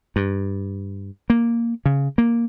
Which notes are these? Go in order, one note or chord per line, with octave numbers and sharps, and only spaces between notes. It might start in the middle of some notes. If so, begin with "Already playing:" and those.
G2
A#3
C#3
A#3